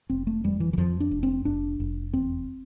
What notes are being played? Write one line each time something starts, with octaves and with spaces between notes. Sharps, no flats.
F1 C4
A3
F2 G3
E3
E3
F2 F3
D4
F1
C4
F1 D4
F1
E2 C4